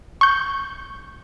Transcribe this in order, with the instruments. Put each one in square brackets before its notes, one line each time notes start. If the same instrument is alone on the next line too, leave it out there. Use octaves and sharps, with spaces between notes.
[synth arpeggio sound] C#6 G6